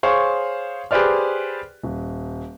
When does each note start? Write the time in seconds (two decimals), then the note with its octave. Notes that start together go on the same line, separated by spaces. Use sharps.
0.03 G#4 C5 C#5 F5 C#6
0.91 G4 G#4 B4 C5 D5 F6
1.83 D#1